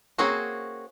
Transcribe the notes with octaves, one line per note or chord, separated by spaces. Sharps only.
A#3 C4 C#4 F#4 G#4